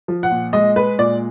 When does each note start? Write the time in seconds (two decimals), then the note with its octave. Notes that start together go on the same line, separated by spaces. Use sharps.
0.08 F3
0.23 F#5
0.31 A#2
0.53 G#3 D#5
0.76 G#3 B4
0.98 A#2 D5